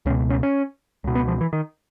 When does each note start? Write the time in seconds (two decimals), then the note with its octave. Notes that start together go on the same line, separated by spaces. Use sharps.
0.06 C#2 C#4
0.10 B2
0.30 C#4
0.43 C#4
1.04 C#2 B2
1.15 B3
1.28 F3
1.41 E3
1.53 D#3